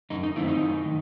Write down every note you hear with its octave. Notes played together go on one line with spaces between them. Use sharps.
F#2 D#4
D#4
D#3 A3 C4 E4
D#4
F#2
D#3